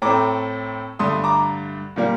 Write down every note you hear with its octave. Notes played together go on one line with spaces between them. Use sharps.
A2 A3 C4 A#5 D6
G2 D3 A3 C6 D#6
A#5 D6
A#2 G3 A#3